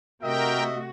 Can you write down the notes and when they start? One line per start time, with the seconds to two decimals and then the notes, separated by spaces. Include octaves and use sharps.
0.22 C3 A3 F#4 A#4 D#5 E5 G5